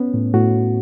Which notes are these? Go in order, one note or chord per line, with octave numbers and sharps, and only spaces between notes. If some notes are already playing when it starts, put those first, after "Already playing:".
Already playing: B3 C#4
A2
A2 F#4